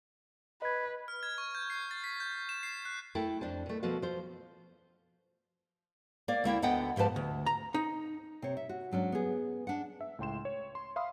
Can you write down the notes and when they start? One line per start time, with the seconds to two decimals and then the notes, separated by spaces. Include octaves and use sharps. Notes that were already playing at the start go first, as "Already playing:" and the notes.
0.62 B4 D#5 G#6
1.08 F6
1.23 G#6
1.38 C#6
1.55 G6
1.70 C7
1.91 A6
2.04 B6
2.20 G6
2.49 E7
2.63 C7
2.85 F#6
3.15 A3 E4 A4 G5 A5
3.41 F2 D4 C5 A5
3.66 B2 A3
3.83 B2 F3 B3 F#4 A4 F5
4.02 F3 C5
6.28 A#3 D5
6.44 D2 A#3 E4 G5
6.62 D2 D3 B3 D#5 F#5 G5
6.96 G#2 F3 G4 B4 A5
7.16 D2
7.46 A#5
7.74 D#4
8.42 C3 C4 C#5
8.57 E5
8.69 F#4
8.91 G#2 F#3 C#4 D4
9.12 B3 G#4
9.67 D4 F#5
10.01 E5
10.19 C#2 A2 G5 C6 E7
10.45 C#5
10.75 C6
10.96 E5 F5 B5 C6 D#6